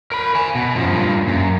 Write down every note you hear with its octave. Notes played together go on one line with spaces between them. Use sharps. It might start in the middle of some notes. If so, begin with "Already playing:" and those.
A#4 B5
G#5 B5
B2
F#2 F3
G2 A#2
F#2